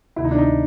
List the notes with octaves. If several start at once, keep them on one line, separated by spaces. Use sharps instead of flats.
D2 C3 D#3 E4
D#4
D4
D#4